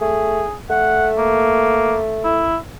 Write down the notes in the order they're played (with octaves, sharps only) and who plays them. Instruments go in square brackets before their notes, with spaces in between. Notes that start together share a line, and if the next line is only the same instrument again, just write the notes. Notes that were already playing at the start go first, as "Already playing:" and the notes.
[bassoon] A3 [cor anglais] G#4
[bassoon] A3 [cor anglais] F#5
[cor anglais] A#3
E4